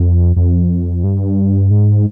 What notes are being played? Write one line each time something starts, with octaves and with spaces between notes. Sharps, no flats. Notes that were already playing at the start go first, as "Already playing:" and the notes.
Already playing: F2
F2
G2
G#2